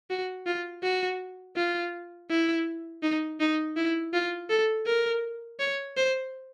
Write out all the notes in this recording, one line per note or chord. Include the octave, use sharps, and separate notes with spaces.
F#4
F4
F#4
F4
E4
D#4
D#4
E4
F4
A4
A#4
C#5
C5